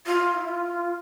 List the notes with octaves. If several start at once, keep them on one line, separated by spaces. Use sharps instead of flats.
F4
E4
F4